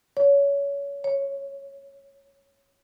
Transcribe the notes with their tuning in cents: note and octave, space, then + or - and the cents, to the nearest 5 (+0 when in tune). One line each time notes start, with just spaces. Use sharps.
C#5 +25
C#5 -5